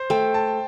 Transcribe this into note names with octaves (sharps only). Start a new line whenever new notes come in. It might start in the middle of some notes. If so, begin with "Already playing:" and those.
Already playing: C5
A3 G5
A5